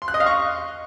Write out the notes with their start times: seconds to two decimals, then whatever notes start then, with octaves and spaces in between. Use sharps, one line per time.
0.02 C6
0.08 F#6
0.14 D#5
0.20 F5
0.26 C#6